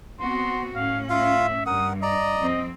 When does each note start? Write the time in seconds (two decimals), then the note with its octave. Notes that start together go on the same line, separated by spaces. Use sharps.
0.20 B3 C4 F#4 C6
0.75 A2 C#4 F5
1.10 F4 E5 F5
1.66 G2 A#4 F#5 D#6
2.02 D5 D#5 A#5
2.39 F2 C4